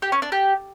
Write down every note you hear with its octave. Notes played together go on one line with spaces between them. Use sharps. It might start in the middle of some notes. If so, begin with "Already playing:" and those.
G4
C#4
D4
G4